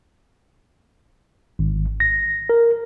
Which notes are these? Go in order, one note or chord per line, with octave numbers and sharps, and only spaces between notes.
G#1
A#6
A#4